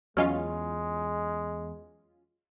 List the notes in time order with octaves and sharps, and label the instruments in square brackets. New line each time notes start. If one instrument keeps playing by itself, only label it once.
[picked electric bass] E2 [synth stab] F#3 C#4 F4 [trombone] G#3 [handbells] D#5 F6